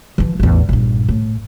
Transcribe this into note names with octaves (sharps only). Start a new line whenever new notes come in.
E3 F3
A1 E2
A#1 G2
A2